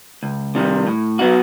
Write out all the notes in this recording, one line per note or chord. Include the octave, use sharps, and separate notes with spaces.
C#2
C3 D#3 G3
A2
F#3 B3 D#4 F#4